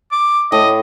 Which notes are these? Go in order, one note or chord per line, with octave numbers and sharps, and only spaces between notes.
D6
A2 D#5